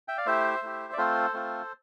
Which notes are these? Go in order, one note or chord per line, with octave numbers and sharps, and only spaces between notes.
E5 G5
D5 F5
A3 E4 G4 C5 E5
A3 E4 G4
D5
A3 C4 F4 A4 C5
A3 C4 F4